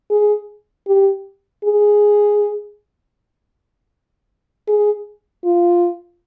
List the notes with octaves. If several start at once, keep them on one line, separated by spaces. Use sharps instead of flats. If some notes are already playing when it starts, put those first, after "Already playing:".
G#4
G4
G#4
G#4
F4